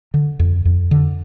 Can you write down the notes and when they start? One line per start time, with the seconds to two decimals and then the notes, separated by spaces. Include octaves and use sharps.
0.14 D3
0.39 F2
0.65 F2
0.91 D3